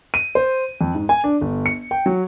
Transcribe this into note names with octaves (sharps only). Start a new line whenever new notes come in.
D#7
C5
F2
G#2
G#5
D4
G1
C#7
G5
F#3